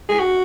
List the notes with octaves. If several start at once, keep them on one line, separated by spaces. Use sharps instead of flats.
G#4
F#4